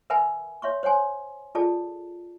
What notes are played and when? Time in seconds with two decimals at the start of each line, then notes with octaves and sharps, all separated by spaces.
0.10 A#4 B4 E5 F#5 G#5 B5
0.62 C#5 E5 C6 C#6
0.83 C5 C#5 F#5 G#5 C6
1.55 F4 G#4 A4 D5 A5